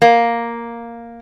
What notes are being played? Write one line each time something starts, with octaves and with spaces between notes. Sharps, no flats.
A#3